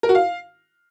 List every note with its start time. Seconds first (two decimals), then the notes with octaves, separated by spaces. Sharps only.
0.03 A#4
0.09 F#4
0.15 F5